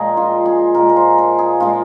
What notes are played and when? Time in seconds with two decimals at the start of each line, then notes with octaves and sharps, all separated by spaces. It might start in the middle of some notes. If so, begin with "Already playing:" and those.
Already playing: A#2 F3 G#3 G#4 A#4
0.17 F4
0.46 G#4
0.75 A#2 F3 G#3 A#4
0.89 A#4
0.96 C5
1.18 A#4
1.39 G#4
1.60 A#2 F3 G#3 F4